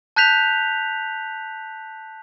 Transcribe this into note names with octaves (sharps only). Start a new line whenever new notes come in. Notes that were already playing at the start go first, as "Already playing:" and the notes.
A5 F#6 G6 B6 F7